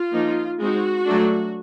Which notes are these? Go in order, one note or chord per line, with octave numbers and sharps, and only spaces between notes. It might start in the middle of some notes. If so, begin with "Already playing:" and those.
Already playing: F4
F3 A#3 D#4
G#3 C4 D#4 F#4
F#3 A3 D4